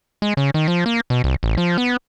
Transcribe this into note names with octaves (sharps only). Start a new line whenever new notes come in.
G#3
C#3
D#3
F3
A#3
B2
C2
A1
F3
B3